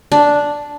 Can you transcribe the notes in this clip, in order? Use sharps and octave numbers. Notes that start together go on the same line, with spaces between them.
D4